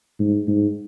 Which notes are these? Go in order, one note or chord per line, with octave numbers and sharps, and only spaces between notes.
G#2
G#2